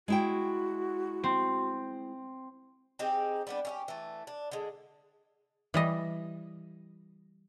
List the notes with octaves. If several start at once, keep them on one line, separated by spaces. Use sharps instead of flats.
G#3 E4 F#4 G5
C4
C4 D#4 G4 G#4
G3 B3 D4
C#4 E4 G4
E3 A3
D4
D3 G#3
E3 G3 D#5